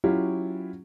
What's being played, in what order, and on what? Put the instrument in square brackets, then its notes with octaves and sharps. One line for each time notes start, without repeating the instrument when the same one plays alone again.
[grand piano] F#3 C#4 E4 F4 G4